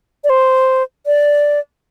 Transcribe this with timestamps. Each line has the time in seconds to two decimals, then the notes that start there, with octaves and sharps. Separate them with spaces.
0.24 D5
0.30 C5
1.06 D5